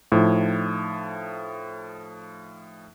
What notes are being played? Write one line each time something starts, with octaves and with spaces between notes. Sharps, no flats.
A2 F3 D#4